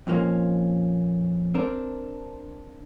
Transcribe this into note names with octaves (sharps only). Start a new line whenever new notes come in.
F2 A#2 F3 A#3 C#4
C4 D4 A#4